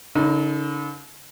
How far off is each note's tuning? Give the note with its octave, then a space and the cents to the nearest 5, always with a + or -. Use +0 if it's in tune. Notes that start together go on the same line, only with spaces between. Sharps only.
D3 -45 D#4 +20 A#4 -20